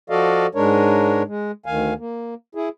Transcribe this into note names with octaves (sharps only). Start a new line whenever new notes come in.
F3 F#4 A4 D5 D#5 F5
G#2 G#3 D4 A#4 C#5
G#3
D2 D#3 F5 G#5
A#3
E4 G#4